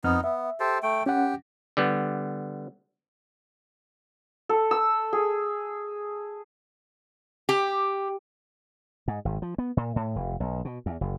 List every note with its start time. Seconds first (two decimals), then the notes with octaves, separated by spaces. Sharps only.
0.04 F2 B3 C4 D#4 F6
0.24 B3 E5
0.60 G4 A4 C5
0.83 A3 G5
1.06 C#4 G4 F#5
1.77 D3 G3 B3
4.49 A4
4.71 E6
5.13 G#4
7.49 G4
9.08 G#2
9.25 G#1
9.42 F3
9.58 B3
9.77 A#2
9.96 A2
10.16 F1
10.40 B1
10.65 B2
10.86 E2
11.01 F#1